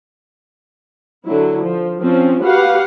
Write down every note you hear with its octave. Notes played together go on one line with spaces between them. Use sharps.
D3 F#3 E4
F3
F3 C4 C#4
F#4 G4 B4 F5 F#5